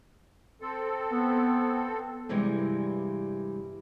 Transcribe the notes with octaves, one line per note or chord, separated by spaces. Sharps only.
C4 A4
B3
G2 C3 E3 G3 G#3